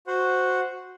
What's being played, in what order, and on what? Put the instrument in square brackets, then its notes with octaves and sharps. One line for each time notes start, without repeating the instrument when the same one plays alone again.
[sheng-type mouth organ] F#4 C5 F#5